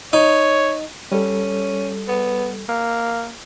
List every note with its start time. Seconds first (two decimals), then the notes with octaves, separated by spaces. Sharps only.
0.13 D#4 C#5
1.12 G3 C#4 A4
2.08 B3
2.69 A#3